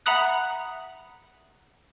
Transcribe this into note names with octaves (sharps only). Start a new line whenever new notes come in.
E5 F#5 A#5 B5 D#6 F#6